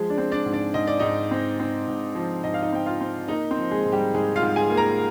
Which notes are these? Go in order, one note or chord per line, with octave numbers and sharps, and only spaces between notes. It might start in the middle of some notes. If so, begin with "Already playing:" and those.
Already playing: F3 G#3 G#4
D4 D5
C4
D4 D5
G#2
D4 D5
G#2 D#5
D5
G#2 D#4 D#5
C4
C4
G#2
F3
G#2 D#5
F5
D#4 D#5
C4 G5
F4 F5
C4
A#3 D#4 D#5
C4 C5
F3
G#3 G#4
G#2
G3 G4
G#2 G#3 G#4
F4 F5
G#2
G#4 G#5
A#3
A#4 A#5